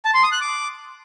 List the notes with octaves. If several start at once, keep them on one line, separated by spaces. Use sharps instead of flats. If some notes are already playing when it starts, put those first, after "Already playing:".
A5
C6
D#6
F#6
D6